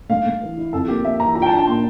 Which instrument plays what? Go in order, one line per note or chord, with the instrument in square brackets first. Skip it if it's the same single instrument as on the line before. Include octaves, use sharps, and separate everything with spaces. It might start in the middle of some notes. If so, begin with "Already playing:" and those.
[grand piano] A3 [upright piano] F5
[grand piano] A3
E3
E4
[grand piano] F2 [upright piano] A4
[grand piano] A#3 [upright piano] G4
[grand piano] A#3 [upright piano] E5
[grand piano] E3 [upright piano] A#5
[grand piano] F4 [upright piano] A#5
[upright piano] G5
A5
[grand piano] D4
[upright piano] A5
[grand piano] A#2 [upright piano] C6